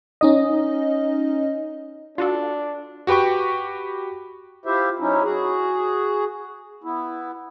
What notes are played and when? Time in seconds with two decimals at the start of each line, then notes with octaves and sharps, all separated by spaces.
0.21 C#4 D#4 D#5
2.18 D4 F4 F#4 A4
3.07 F#4 G4 B4 G5 C#6
4.66 E4 F4 G4 C5 E5
4.99 F#3 C#4 D#4 E4
5.23 F#4 G#4
6.84 B3 E4